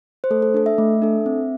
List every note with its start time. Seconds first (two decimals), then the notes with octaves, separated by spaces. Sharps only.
0.24 C5
0.30 A3 A4
0.42 A4
0.54 D4 A4
0.66 E5
0.78 A3
1.02 D4 A4
1.26 C4